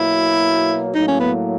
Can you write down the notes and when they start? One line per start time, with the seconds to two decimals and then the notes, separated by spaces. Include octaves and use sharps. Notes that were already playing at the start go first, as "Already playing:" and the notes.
Already playing: B2 F#3 A#3 E4
0.95 A2 F#3 A#3 D#4
1.08 C#4
1.20 B3